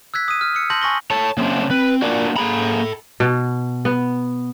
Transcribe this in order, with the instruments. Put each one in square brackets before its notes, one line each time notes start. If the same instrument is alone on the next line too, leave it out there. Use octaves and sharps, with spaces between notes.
[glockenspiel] E6 F#6 G#6 B6
D#6 D#7
F6
E6 C#7
A5 C6 G6 A#6 F#7
G#5 C#6 A#6 G7
[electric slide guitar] A4 C#5 [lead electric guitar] A5
[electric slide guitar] C#3 C4 D4 [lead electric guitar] F#3 A#3
[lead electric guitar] C4 [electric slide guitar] B4
[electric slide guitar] A#3 D4 F#4 [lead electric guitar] A#4 D5
[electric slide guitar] A#3 G#4 A#5 [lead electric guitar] A4 B5
[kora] B2
B3